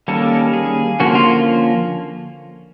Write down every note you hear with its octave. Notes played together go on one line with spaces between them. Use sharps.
D#3 G3 A#3 C#4 A4
G#4
D3 F3 A#3 C#4 F#4
F4